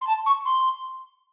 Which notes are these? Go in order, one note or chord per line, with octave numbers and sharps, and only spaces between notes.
C6
A5
C#6
C6